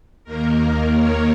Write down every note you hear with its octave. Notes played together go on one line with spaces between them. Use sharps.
D#2 D#3 A#3 A#4
A#4
C#5